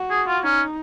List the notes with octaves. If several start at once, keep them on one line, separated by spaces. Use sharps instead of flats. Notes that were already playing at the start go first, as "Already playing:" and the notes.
Already playing: F#4
G#4
F4
C#4 D#4